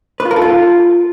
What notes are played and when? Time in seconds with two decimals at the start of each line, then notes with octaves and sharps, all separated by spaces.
0.20 B4
0.25 F4
0.31 A#4
0.36 A4
0.42 F4